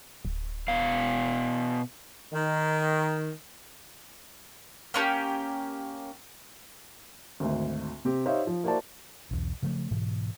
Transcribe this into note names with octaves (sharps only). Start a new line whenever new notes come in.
D1
B2 F5
D#3
A#3 C#4 D4 G4
G#1 D2
C3 C4 G4
D#4 G4 C5 C#5 E5 F5
F3
A#3 E4 F#4 C5 D5 A5
B1 E2
C#3 F3 F#3 A3
G#2 B2 E3